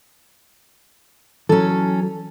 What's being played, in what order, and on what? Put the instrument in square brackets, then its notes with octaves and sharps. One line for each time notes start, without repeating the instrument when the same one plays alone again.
[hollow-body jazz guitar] E3 F#3 [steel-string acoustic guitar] C#4 A4